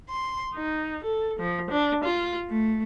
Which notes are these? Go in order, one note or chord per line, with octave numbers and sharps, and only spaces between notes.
C6
D#4
A4
F3
D4
F4
A3